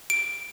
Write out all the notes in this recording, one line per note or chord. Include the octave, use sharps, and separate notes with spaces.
D7